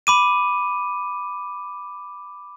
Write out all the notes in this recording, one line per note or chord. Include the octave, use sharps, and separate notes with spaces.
B5 D6 D#7